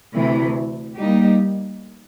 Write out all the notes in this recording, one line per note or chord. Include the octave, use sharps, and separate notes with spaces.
D2 C3 E3
G3 A#3 D#4 G4